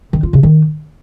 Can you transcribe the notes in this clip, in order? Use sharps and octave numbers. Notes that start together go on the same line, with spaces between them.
D#3
F4
C#3
D#3